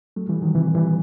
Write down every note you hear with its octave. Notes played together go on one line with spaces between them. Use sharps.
F#3 A3
E3 G3
D#3 F#3
C3 E3
E3 G3